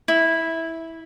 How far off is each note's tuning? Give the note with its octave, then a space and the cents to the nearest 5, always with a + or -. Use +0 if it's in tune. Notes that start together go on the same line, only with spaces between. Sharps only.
E4 -10